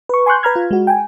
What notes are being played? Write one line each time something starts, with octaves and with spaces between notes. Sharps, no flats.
B4 C#6
G#5 C6 C#6 F#6 G6
B4 A#5 B5 F6 G#6
F4
G#3 F#4
G5 G#5